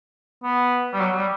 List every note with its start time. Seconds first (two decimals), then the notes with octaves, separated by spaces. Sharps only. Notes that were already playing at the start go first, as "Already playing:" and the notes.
0.43 B3
0.93 G3
1.01 F#3
1.16 G3